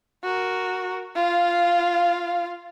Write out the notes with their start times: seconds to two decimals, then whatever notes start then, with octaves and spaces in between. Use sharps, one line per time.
0.24 F#4 A#4
1.16 F4 F5